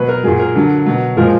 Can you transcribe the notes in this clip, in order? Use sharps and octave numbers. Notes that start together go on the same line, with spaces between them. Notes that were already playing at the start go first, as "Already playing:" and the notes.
Already playing: B2 F#3 B4
A#4
A#2 F#3 G#4
A#4
D3 F#3
B2 F#3
A#2 F3 G#3 A#4